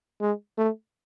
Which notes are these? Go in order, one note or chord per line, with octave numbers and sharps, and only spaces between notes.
G#3
A3